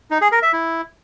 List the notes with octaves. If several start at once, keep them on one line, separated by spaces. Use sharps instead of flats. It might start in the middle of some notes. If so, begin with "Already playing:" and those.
D#4
G#4
A#4
E5
E4